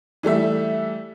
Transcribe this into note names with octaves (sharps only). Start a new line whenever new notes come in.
E3 G3 A3 E5